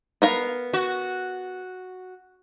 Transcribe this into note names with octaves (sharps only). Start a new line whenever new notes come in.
B3 A#4 F5
F#4